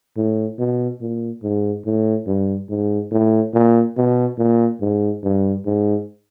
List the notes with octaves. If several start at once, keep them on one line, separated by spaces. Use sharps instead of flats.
A2
B2
A#2
G#2
A2
G2
G#2
A2
A#2
B2
A#2
G#2
G2
G#2